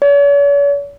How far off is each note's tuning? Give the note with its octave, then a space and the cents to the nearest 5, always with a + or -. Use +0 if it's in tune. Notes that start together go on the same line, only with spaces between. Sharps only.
C#5 +45